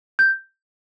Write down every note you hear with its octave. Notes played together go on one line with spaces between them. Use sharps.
G6